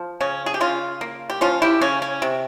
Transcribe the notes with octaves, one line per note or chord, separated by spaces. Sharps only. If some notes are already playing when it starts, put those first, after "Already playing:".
Already playing: F3
C#3 C#4
G#4
G4
C#3 C#4 F4
A#3
G4
F3 C#4 F4
E4 G4
C#3 C#4
C#4
C3